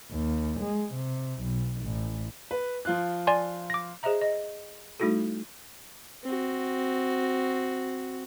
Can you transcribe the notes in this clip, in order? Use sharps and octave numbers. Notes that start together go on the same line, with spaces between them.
D#2
G#3
C3
B1
A1
B4
F3 F4 F#6
D5 G#5 C6
D6 A#6
G#4 C5 D#5 E5 A#5
D#5
G3 A3 D#4 E4 F#4 A4
C4 F#4